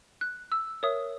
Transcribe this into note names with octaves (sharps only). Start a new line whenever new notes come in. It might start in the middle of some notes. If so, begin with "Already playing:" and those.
F#6
E6
A#4 C#5 E5 D#6